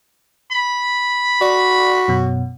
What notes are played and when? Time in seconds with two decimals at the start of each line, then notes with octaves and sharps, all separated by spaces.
0.52 B5
1.41 F#4 D5
2.08 F#2 B2